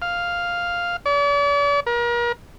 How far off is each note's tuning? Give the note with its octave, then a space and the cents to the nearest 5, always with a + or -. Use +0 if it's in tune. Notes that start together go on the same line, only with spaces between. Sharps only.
F5 +0
D5 -45
A#4 +35